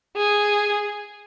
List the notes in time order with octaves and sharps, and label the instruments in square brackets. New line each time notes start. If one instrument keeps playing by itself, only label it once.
[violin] G#4